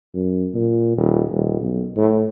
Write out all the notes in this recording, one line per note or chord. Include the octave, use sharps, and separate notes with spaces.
F#2
A#2
D#1
D#1
B1
A2